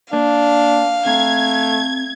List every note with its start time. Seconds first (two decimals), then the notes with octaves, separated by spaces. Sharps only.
0.13 A#3 D4 F5
1.06 A3 C4 G5 A#5 G#6